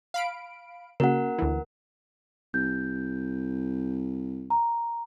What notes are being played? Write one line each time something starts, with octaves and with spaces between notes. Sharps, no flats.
F5 B5 D7
C#3 A#3 C#4 F#4 A#4 F#5
D2 E3
C2 G6
A#5